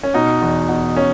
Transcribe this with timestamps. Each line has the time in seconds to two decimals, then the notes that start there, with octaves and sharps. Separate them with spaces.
0.03 C#4
0.14 B2 D#4
0.41 E2
0.69 B2
0.96 C#4